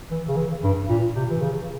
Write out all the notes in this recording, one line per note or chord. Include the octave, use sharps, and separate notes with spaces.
E3
C#3
E3
G2
A#2
C3
E3
C#3